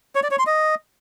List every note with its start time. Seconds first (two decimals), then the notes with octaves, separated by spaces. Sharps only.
0.15 C#5
0.23 D5
0.31 C#5
0.39 C6
0.47 D#5